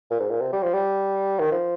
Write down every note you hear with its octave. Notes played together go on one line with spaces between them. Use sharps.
A#2
G#2
A#2
C3
G3
F3
G3
D#3
F3